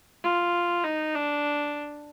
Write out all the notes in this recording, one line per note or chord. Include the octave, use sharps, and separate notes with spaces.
F4
D#4
D4